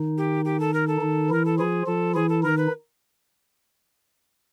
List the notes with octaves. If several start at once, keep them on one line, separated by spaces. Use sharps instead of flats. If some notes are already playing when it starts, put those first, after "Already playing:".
Already playing: D#3 D#4
G4
G4
A4
A#4
A4
D#3 D#4
E3 E4 A#4
A4
F3 F4 G#4
F3 F4 A4
E3 E4 G#4
A4
D#3 D#4 A#4
B4